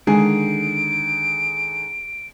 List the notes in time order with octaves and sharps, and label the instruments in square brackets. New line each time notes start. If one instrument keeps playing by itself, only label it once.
[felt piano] D3 D#3 G#4 [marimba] G#3 G#5 [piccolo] D7